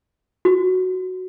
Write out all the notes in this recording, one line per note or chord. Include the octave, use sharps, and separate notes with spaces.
F#4